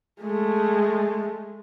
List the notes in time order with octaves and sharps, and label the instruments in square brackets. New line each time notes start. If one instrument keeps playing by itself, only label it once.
[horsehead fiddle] G#3 A3